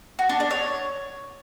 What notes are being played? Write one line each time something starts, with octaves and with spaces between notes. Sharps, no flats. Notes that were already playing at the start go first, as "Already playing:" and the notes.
F#4
D4
D4
C#5